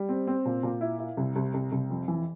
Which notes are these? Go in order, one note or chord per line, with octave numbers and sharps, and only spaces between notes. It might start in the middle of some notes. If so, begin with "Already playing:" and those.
Already playing: G3
C4
C4
A#2
A#2
E4
E4
C2
C2
C2
C2
F2
E3